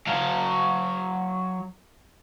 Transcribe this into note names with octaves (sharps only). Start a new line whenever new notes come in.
F#3 F5